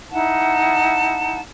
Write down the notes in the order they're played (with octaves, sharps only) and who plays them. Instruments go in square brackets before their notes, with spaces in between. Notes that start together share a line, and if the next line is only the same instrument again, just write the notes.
[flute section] D#4 E4 F#5 A5